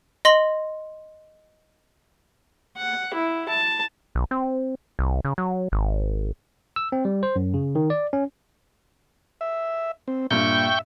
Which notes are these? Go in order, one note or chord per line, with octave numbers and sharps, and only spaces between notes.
D#5 C6 A#6 F#7
F#5
E4
A5
B1
C4
C2
C#3
F#3
G#1
E6
C4
G3
C5
F#2
C#3
D#3
D5
C#4
E5
C4
G2 A#2 E5 G5 C#6 G6